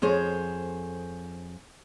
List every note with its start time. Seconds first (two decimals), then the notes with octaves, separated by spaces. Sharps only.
0.02 F2 G#4 C5 C#5